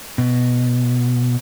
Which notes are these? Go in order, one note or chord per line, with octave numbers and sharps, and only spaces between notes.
B2